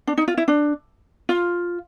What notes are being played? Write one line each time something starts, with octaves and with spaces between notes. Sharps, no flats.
D4
D#4
F4
E4
D4
F4